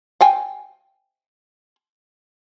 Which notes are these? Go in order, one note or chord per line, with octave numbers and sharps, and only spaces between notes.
F5 G5 G#5